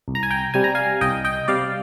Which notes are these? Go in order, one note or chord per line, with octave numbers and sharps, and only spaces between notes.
C2
A#5
G#5
G5 A#5
C3 G3 G#5
A#5
F5 G#5
C2 D#5 G5
D#5 G5
C3 G3 D5 F5